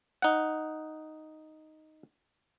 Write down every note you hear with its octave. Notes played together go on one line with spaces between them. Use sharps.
D#4 F#5